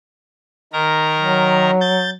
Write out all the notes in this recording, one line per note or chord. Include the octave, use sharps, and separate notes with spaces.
D#3 A#4 A#5
F#3
G6 A6